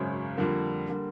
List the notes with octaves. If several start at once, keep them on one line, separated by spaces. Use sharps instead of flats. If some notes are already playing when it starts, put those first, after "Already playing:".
Already playing: G#1 F#2 C#3
F2 D3 G3 A#3
D3 G3 A#3